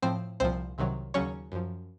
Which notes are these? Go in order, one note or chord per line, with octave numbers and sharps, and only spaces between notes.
A2 F3 C4 C5
C2 A#2 F3 C4 C5
C2 C3 D#3 F#3
D#2 C#3 F#3 C#4 C#5
F#2 F3